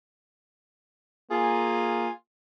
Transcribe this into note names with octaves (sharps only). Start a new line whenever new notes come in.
A#3 F4 G#4 G#5